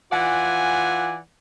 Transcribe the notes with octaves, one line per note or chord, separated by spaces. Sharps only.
E3 F4 D5 F#5 G#5